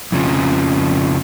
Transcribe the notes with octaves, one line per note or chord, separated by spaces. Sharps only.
F2 C#3 F3